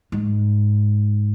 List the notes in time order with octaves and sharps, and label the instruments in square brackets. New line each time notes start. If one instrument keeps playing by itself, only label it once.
[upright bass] G#2